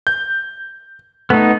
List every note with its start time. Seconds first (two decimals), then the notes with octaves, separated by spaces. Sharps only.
0.07 G6
1.30 A3 B3 D#4